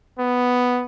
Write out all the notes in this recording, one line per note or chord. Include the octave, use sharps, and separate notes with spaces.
B3